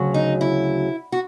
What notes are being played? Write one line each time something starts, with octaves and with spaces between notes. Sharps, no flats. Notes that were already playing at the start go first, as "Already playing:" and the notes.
Already playing: D2 C#3 F#3
D#4
E4
F#4